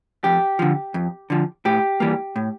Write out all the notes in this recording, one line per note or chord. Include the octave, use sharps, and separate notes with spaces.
F2 G4
D3 F3
F2
D3 F3
A2 G4
E3 G3 A#3
A2